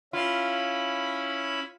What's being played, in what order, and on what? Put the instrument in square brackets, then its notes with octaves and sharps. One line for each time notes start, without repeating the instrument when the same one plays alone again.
[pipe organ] C#4 E4 B5 [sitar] F4